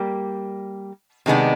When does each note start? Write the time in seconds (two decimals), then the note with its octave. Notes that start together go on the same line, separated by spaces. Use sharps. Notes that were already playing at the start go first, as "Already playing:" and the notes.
Already playing: G3 A#3 G4
1.26 C3 D#3 G#3 B3 D4